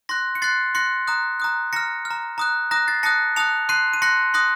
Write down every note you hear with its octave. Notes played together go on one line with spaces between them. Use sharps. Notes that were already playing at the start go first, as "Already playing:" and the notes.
C6 F#6 A#6
C#7
C6 F#6 A6 C7
C6 F#6 A#6 C#7
A#5 D#6 F#6
A#5 D#6 F#6
A#5 F6 A#6 C#7
F6
A#5
A#5 D#6 F#6
A#5 D#6 F#6 A#6
A6 C7
A5 D#6 F#6 A#6 C#7
A5 D#6 F#6 C#7 F7
C6 F#6 C7 D#7
D#7
C6 F#6 A#6 C#7
C6 D#6 F#6 A#6